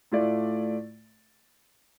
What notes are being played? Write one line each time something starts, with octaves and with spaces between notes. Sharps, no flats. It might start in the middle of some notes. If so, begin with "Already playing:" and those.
A2 A3 F4 D5